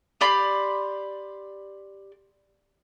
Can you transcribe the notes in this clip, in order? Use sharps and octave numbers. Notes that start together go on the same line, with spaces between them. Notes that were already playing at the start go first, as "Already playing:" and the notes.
G4 D5 B5 C6